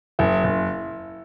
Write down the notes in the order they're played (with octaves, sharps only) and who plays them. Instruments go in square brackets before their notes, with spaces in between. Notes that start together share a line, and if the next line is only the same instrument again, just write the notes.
[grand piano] F#1 [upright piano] E4
[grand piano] F#1